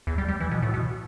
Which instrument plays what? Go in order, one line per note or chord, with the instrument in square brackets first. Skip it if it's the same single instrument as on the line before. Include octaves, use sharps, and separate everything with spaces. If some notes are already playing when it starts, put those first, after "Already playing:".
[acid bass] E2
G3
G3
E3
B2
A2
B2